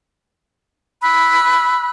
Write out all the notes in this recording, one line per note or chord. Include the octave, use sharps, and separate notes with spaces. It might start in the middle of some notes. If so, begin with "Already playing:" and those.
B5 E6 F#6